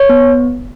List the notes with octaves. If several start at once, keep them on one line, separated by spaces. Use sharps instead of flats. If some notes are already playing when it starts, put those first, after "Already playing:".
Already playing: C#5
B3